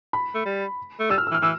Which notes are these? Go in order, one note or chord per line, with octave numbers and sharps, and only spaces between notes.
B5
A3
G3
A3
G3 E6
F6
E6
E3
F6
E3 E6